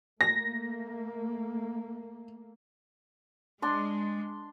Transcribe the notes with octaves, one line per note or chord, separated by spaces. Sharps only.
A3 A#3 A#6
G#3 D4 C6